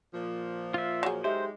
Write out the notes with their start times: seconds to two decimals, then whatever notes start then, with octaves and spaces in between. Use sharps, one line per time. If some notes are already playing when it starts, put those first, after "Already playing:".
0.14 A#2 F3
0.74 F4 E5
1.03 F#3 G#4
1.24 G#3 D#4 G4 A4 C5 E5